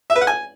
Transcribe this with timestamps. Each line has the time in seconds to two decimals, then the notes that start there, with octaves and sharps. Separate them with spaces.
0.10 E5
0.16 B4
0.21 F#5
0.27 G#5